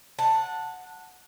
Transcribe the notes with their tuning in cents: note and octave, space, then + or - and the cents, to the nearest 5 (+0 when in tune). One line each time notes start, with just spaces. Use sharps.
F#5 -15 A5 +10